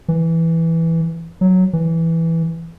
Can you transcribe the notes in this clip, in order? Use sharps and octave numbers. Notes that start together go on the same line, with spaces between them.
E3
F#3
E3